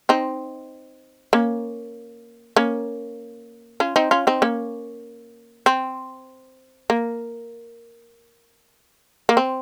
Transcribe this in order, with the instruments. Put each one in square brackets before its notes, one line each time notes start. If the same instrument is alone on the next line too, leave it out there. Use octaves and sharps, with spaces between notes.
[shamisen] C4 D#4
A#3 C#4
A#3 C#4
C#4 F4
C4 D#4
C#4 F4
C4 D#4
A#3 C#4
C4
A#3
A#3
C4